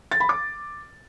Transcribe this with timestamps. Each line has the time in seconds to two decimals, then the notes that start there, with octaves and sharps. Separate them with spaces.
0.11 A6
0.20 B5
0.29 D6